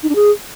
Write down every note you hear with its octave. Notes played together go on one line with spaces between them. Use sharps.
D#4
D4
G#4